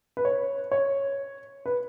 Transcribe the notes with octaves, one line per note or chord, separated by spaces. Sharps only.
B4
C#5
C#5
B4